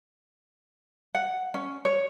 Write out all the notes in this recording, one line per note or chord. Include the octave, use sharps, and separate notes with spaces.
F#5
C#4
C#5